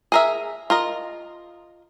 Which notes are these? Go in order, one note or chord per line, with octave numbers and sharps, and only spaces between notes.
G#4 A#4 E5
F4 A#4 D#5